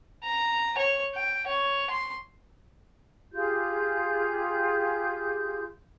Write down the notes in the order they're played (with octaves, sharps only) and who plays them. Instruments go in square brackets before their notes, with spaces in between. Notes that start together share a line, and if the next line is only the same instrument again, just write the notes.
[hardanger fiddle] A#5
C#5
G5
C#5
C6
[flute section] F4 G4 G#4 G6